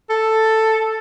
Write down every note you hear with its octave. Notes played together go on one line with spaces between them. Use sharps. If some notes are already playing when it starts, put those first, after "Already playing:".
A4